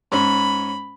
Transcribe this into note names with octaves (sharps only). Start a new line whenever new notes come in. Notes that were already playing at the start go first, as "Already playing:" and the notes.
G#2 C#4 B5